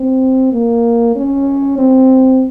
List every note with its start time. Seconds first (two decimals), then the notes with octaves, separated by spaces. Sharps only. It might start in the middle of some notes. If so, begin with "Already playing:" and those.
Already playing: C4
0.52 A#3
1.15 C#4
1.78 C4